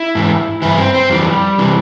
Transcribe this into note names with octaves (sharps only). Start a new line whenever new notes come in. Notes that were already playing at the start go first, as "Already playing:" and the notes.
Already playing: E4
G#2 E3
G2 E3 E4
C4
C4
F2 E3 G3
C3 E3